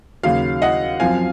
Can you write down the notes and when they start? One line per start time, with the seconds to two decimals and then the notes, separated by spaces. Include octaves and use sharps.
0.23 D#2 C#3 F#3 F5
0.62 D#5 F#5
1.00 F#2 F3 C4 F4 F5 G#5